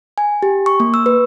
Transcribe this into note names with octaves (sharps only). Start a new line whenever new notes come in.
G#5
G4
C#6
A#3
E6
B4